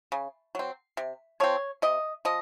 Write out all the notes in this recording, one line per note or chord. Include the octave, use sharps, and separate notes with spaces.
C#3
F#3 C4
C3
F3 C4 C#5
C3 D#5
F3 D#5